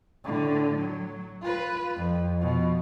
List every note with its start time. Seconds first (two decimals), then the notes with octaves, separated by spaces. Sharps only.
0.24 A2 D3
0.78 F#3
1.41 F4 B4
1.96 F2
2.42 B2 F3